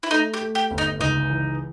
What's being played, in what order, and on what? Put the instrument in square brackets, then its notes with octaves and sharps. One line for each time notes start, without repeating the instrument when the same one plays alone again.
[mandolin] E4
[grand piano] A3 [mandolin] D#4
[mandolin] G4
[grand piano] A3
[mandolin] G4
[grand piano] G1
[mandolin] D#4
[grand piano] C#2 [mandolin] D#4
[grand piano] E3